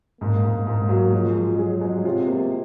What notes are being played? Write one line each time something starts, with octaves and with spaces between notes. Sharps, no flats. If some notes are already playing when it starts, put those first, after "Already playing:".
G#2 A#3
G#2
G#2 A#3
F#3
F3 G#3
F3
F#3 G#4
G#3
C3 F4
A#3